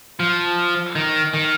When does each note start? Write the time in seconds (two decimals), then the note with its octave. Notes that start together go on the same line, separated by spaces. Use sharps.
0.20 F3
0.96 D#3
1.34 D#3